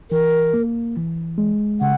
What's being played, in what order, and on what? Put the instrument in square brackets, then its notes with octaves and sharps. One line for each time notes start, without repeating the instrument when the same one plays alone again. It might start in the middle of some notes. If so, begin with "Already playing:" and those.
[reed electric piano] E3 [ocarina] A#4
[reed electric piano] A#3
E3
G#3
[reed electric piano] C#3 [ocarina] F#5